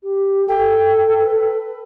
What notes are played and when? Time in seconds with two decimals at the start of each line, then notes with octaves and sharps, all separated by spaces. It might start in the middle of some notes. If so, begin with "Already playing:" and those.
0.03 G4
0.48 A4 G5
1.19 B4